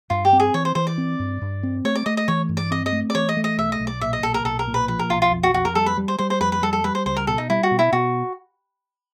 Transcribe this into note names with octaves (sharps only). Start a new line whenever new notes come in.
G2 F4
G4
C4
G#4
E3 C#5
C5
E3 C5
D5
C4
G2
G2
C4
A3 C#5
D5
A3 D#5
D#5
E3 C#5
G2
D5
C4 D#5
D#5
A3
D5
E3 C#5
D#5
A3
D#5
B1 E5
D#5
B1
D5
A#2 E5
D#5
B1 A4
A#4
B1 A4
A#4
A#2
B4
F3 B4
A#4
B1 F4
F4
F2
F#4
F2 F#4
A#4
G3 A4
B4
G3
C5
G3 C5
C5
F2 B4
B4
G3 A4
A4
G3 B4
C5
C#2 C5
A#4
B2 A4
D#4
G3 E4
F#4
B2
E4
B2 F#4